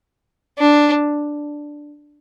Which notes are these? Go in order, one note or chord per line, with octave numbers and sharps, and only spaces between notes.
D4